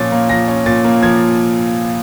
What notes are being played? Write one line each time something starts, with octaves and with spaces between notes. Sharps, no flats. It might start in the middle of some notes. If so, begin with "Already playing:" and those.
Already playing: A#2 F3 C#4 A6
A#3
F3 A#6
C#4
A#2 A6
A#3
F3 G#6